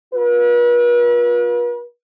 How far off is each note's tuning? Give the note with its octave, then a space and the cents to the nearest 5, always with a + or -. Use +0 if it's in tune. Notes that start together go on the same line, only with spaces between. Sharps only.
F4 +30 B4 -40